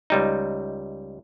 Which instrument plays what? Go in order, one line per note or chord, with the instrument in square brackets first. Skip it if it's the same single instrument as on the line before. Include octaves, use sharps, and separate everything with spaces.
[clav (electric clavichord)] C#2 G3 D#4